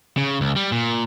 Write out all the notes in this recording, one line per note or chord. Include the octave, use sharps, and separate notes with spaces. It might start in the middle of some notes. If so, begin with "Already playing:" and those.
C#3
C#2
G3
A#2